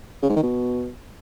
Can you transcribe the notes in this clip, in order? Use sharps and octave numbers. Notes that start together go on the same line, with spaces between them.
C#3
G#2
D#3
B2